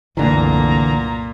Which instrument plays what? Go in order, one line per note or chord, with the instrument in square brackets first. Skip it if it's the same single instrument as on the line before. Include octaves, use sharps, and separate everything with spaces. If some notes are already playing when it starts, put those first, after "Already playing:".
[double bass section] F#1 C2 A3 [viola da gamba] A#2 [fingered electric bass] D3 E3 [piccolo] A#5